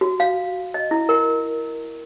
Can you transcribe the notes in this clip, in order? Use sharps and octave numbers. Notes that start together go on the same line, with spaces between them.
F#4
F5
D#5
E4
A#4